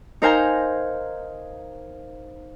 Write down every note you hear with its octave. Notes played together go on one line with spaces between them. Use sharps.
D#4 A#4 C5 F5 G#5 A#5